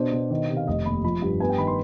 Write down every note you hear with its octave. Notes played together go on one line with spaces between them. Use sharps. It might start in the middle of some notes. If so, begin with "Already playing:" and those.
Already playing: B2 D4 C5
B2
D#3
C3
F5
F1 D#5
D#2 B5
F3 B5
G2
B3 G#5
G5
D#3 B5
C6